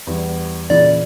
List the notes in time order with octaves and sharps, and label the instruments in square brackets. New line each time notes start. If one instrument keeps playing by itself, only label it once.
[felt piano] E2 E3 G3
[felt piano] A#2 C#3 E3 [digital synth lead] D5